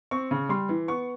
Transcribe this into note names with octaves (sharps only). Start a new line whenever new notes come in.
C4 C#6
C#3
G3 C6
E3
B3 C#6